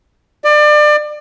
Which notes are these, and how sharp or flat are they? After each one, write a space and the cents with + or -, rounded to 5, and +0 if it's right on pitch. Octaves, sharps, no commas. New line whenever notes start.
D5 +30